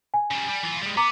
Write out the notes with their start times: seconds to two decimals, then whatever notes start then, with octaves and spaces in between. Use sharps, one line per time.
0.14 G#5
0.31 C#3 G3
0.49 G3
0.63 E3 F4
0.82 G3 G#3
0.97 B3 A#5 D6